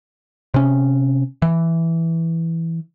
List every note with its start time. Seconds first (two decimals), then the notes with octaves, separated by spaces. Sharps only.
0.54 C3 C#4
1.42 E3